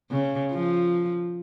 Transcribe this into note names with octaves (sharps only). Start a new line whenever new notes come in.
C#3
F3